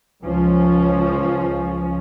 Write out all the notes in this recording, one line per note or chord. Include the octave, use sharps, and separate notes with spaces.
C#2 F3 C#4